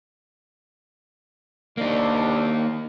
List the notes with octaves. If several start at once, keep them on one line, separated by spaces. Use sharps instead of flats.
C2 A#3 D4 D#4